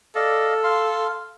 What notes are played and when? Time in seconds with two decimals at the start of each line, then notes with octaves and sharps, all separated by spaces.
0.15 A4 D5 D#5 F5
0.64 F5 C6